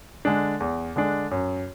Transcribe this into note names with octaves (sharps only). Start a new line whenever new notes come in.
D3 G#3 D4
E2
D3 G#3 D4
F#2